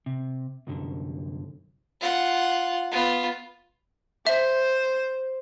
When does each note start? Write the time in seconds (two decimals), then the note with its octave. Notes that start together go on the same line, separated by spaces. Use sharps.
0.06 C3
0.67 C2 F#2 D3
2.00 F4 F#5
2.91 B3 F4
4.27 C5 E5